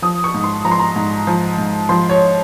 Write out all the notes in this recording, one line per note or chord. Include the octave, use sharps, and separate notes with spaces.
F3 D#6
C#6
G#2
C6
F3 A#5
C6
A#5
G#2
F3
G#2
F3 C6
C#5